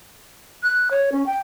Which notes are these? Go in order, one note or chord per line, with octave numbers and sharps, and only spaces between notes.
F#6
C#5
C#4
G5